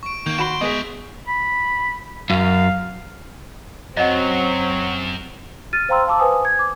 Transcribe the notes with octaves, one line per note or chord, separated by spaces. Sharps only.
C#6 D7
D#3 A#3 G6 D7
E4 F#4 B5 C6
G#3 B3 G#4 D#5 E5
B5
F#2 F5
F#2 F#3 C4 D#5 F#5
F6 A6 D#7
C5 F5 G5 A#5 C6 E6
F5 A5 D6 E6
B4 C5 G#5 D#6
G#6
D6